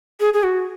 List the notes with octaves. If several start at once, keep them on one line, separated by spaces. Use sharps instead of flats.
G#4
G#4
F#4